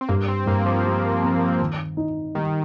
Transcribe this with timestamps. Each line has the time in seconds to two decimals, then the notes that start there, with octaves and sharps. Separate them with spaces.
0.01 C4
0.09 G2 A#3
0.28 C4
0.46 G2 A#3
0.66 F3
0.84 G3
1.23 C4
1.60 D#3
1.97 D#4
2.35 D#3 G3